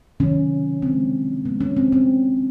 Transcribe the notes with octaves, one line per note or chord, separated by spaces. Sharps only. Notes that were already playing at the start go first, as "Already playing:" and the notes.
C3 D#3 F#3 C#4
C#3 F3 G#3 C4
C#3 F3 G#3 B3
C#4
C4
C4